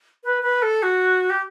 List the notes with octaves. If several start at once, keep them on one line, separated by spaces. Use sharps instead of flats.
B4
B4
A4
F#4
G4